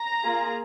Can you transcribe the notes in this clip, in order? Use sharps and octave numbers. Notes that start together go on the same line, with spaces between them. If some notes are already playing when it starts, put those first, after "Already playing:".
Already playing: A#5
A#3 F4 G#4